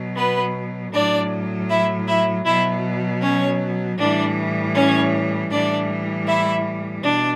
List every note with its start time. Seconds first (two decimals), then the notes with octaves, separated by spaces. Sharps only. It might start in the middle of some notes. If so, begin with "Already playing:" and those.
Already playing: B2 F#3
0.17 B3 B4
0.94 A2 F#3 D4 D5
1.70 E4 E5
2.08 E4 E5
2.46 B2 F#3 E4 E5
3.22 C#4 C#5
3.99 A2 E3 G3 D4 D5
4.75 C#4 C#5
5.51 A2 E3 G3 D4 D5
6.27 E4 E5
7.04 B2 D4 D5